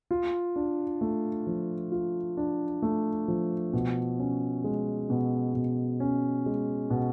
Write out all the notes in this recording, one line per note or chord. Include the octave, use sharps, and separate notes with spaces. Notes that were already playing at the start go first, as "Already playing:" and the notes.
F4
D4
A3
F3
F4
D4
A3
F3
B2
C#4
G#3
B2
B2
C#4
G#3
B2